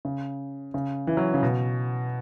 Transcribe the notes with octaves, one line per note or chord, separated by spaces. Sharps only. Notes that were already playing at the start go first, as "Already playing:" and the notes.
C#3
C#3
E3
F#3
C#3
B2